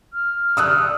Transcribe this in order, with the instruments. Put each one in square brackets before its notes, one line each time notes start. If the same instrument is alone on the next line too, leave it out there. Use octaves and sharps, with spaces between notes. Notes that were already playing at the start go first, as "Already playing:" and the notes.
[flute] F6
[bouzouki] D3 G3 A3 [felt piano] D#6 E6 F#6